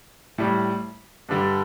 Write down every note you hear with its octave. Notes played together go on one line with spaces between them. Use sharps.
A2 G3
G2 D3 G3